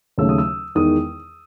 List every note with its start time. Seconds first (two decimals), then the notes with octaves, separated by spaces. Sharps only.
0.18 D#2 C#3 F#3 A3 E6
0.29 D#6
0.38 E6
0.75 E2 D#3 G#3 D#6